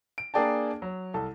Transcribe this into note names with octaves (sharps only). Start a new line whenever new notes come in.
D7
A#3 D4 G#4 D5 G5 A5
F#3
C2 A4 A5